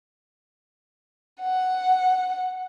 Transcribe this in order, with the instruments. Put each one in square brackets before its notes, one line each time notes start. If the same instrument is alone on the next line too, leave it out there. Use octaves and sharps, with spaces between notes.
[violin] F#5